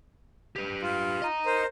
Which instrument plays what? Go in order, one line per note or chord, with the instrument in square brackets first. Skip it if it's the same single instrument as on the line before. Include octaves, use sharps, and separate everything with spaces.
[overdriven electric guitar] G4 B4
[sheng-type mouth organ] F4
[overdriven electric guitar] D#5 A#5
[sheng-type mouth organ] A#4 C5